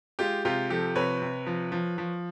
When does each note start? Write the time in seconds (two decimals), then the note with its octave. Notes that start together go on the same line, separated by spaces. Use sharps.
0.19 G#3 F4 G4
0.45 C3 F4 G4
0.70 F3 G4 A4
0.95 C3 B4 C#5
1.22 C3
1.47 F3
1.72 F3
1.98 F3